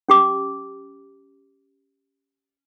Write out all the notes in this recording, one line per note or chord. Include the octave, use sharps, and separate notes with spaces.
C#4 G4 D6